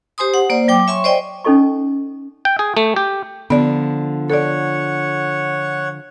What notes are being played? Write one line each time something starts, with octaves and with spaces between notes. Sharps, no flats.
G4 C5 G#5 C6 D#6
F#5
A#3 C5 D5
F#3 G5 D6
C#5 E5 G#5 C6 C#6
C5 D5 D#5 G5
C#4 D#4 A4 D#5 C#6
G5
G#4
A3
G4
D3 F3 B3 D5
A4 C#5 D5 F#5